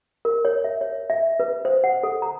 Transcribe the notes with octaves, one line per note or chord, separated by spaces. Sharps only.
A#4
C#5
E5
C#5
E5
B4
C5
F#5
A4
A#5